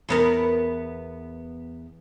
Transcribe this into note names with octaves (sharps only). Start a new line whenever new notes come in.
E2 B3 A#4